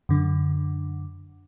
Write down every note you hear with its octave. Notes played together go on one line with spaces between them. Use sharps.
F#2 D3